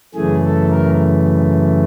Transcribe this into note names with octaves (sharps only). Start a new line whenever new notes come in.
F#2 C#3 E3 A3 G#4
A4
A#4